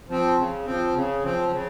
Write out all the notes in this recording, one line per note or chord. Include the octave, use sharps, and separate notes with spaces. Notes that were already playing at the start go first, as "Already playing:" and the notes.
F3 C4
C#3
F3 C4
C#3
F3 C4
C#3